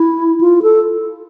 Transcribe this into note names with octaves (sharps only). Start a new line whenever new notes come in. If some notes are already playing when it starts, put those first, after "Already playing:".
Already playing: E4
F4
A4